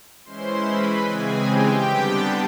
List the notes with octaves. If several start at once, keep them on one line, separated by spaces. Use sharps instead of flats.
E3 G#3 C#4 E4 C5 C6
B4 B5
C#3 E3 G#3 C4 G#4 G#5
G4 G5
D3 G3 B3 D4